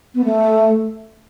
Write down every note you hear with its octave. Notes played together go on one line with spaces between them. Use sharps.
B3
A3